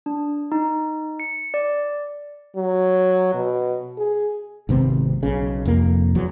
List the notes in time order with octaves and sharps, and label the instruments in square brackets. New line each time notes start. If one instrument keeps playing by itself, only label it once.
[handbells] D4
D#4
C#7
D5
[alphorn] F#3
B2
G#4
[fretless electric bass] G#1 C3 B3 C4
B1 C#3
F1 F2 A#3
E2 F#3